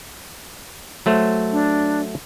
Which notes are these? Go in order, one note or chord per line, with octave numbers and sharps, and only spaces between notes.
F#3 A3 C5
D4